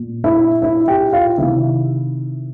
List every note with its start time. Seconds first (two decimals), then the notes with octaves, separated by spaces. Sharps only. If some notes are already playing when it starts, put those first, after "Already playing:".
Already playing: A#2
0.24 E4 E5
0.62 E4 E5
0.88 G4 G5
1.13 F4 F5
1.38 C3 D#3 E4 E5